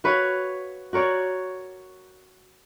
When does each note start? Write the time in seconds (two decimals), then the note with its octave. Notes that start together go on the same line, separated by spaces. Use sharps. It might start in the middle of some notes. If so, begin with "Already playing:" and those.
0.04 F#4 B4 C#5 F5
0.93 F#4 A#4 C#5 D5